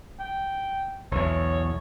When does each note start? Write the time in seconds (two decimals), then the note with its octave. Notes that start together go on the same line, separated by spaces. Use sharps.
0.20 G5
1.12 B1 E2 C#5